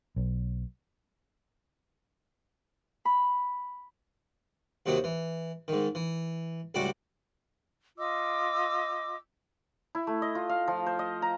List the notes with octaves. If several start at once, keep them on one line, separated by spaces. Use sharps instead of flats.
B1
B5
D#2 C3 D#3 F#3 D#6
E3
G#2 D#3
E3
C#2 A2 G3 F#4 F#5 D6
F4 D#5 D6 E6
E4
A3
D#5
F4
F5
F3
C5
D#5
A#5